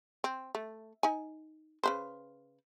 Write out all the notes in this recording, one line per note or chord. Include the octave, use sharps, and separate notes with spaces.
C4
A3
D#4 G#5
C#3 B4 C5